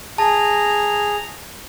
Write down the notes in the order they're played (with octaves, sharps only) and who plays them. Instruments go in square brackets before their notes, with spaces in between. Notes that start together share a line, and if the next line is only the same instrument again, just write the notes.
[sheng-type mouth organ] G#4 A#5 [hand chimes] A5